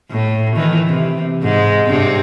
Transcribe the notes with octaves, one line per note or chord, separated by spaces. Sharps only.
A2
D#3 E3
C3
G#2 G#3
G2 C3 C4